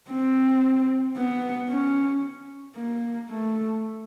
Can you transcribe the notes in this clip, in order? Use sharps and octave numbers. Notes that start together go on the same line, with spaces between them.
C4
B3
C#4
A#3
A3